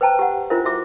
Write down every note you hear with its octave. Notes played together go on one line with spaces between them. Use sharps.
B4 C5 G5 A5 A#5
G4 F#5
D4 E4 F4 A#4 C5 E5
E4 F#4 C5 E5 D6